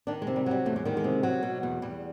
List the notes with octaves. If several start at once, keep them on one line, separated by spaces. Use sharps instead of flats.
D#3 D4
G#3
C3
G3
F#3 G3
E2 A3
G#3
D#3 G3
G#3
C3
F#3
B2
E2
E2 G3